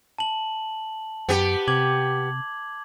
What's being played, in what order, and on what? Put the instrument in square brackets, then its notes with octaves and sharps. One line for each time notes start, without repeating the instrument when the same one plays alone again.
[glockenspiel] A5 F#7
[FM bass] F#2 [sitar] B3 G4
[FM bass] C3 [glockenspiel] D6 G#6 F#7